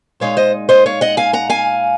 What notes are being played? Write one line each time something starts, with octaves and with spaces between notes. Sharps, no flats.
A#2 G#3 D#4 C#5 F5
C5 D#5
C5 D#5
C#5 F5
D#5 F#5
F5 G#5
F#5 A#5
F5 G#5